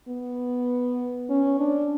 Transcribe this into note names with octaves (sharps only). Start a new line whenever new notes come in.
B3
C#4
D4